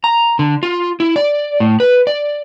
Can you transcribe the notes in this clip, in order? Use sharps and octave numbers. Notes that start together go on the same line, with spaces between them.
A#5
D3
F4
E4
D5
A2
B4
D5